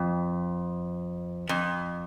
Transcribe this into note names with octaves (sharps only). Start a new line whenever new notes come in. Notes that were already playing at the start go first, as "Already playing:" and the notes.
Already playing: F2
F2